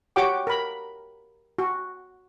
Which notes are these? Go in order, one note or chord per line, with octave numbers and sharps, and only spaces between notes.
F#4 G4 C#5 F#5 G5 D6
A#4 B5
F#4